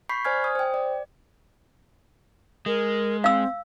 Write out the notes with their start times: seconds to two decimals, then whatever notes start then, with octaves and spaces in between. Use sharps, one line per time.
0.09 B5 C#6 G6 B6 C7
0.25 C5 D5 G#5 F6 G#6
0.44 D#6
0.55 C5 G5
0.74 D5
2.66 G#3 A#4
3.24 C4 F5 E6